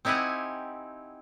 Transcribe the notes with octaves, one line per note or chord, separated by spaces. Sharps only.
C4 D#4 E4 G4 F#5 G#5